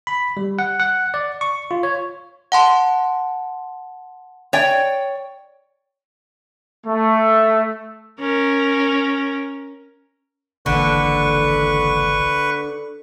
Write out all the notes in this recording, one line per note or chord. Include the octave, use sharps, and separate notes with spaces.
B5
G3
F#5
F#5
D5
C#6
F4
C#5
F#5 A5 C6
C#5 D5 G5
A3
C#4 A#4
G#1 C#2 D3 E3 A#3 B4 C#6